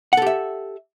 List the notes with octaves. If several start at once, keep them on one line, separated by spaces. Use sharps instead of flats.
G4 A4 E5 F#5